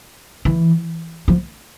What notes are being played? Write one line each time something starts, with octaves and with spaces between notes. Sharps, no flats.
E3
F3